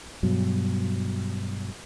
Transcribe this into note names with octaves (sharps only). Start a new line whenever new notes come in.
G2 B2 F#3